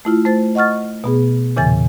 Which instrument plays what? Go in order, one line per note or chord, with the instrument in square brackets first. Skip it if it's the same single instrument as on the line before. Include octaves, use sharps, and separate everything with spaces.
[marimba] A3 E4 F4
A3 C5 A6
D#5 F#5 C#6 F6 A6
B2 B3 G#4
E2 A#2 C#3 E3 G#5 A6